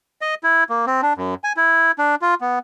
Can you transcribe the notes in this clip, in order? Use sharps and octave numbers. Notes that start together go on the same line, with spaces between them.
D#5
E4
A#3
C4
D4
F#2
G#5
E4
D4
F4
B3